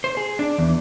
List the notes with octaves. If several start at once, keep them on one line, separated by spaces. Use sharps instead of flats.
C5
G#4
D4
E2